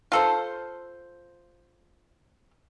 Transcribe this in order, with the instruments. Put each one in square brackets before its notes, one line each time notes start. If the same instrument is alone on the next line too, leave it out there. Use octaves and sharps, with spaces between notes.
[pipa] F4 A4 C5